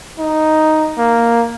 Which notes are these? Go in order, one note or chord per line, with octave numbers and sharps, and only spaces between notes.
D#4
A#3